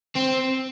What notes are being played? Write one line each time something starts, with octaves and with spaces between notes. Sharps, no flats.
C4